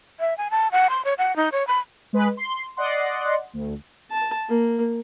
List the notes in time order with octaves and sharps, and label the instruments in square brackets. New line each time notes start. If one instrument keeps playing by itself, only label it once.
[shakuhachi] E5
G#5
A5
F#5
C6
C#5
F#5
D#4
C#5
B5
[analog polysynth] G#3 B4
C6
D5 D#5 F#5 C6
D2
[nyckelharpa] A5
A#3